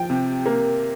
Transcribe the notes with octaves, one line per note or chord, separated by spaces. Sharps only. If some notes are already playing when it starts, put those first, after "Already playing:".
Already playing: F3 G5
C3
A#3